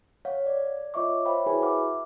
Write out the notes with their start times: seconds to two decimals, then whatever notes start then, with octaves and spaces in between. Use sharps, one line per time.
0.25 C#5 F5 F#5
0.46 D5
0.94 F4 C#5 D#5 E5 C#6 D6
1.26 C5 C#5 E5 F5 G5 B5
1.46 E4 F#4 G#4 B4 G#5 B5
1.62 E5 F#5 D6 F6